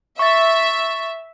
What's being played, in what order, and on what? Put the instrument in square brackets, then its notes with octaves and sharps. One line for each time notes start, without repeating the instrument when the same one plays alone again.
[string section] E5 [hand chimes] C#6 A6